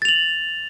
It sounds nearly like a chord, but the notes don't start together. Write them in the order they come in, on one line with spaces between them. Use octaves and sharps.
A6 F7 F#7